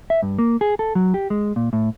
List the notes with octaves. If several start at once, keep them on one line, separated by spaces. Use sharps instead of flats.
E5
G2
A#3
G#4
A4
F#3
G4
G#3
A#2
A2